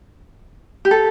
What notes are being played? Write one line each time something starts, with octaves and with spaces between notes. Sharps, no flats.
G4
A4